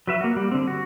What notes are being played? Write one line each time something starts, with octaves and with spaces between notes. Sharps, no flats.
F#3 B4 E5
A#3 F#4
G3
D3 C4
F#4